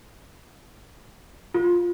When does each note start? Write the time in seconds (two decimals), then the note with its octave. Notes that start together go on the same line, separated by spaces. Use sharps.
1.54 F4